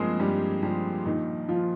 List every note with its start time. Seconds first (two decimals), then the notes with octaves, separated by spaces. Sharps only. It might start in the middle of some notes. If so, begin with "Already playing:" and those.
Already playing: G2 F3 G#3 A#3 C4 G#4 A#4 C5
0.19 G2 G3 G4
0.62 F3 G3 G4
1.05 A#2 D#3 D#4
1.48 F3 F4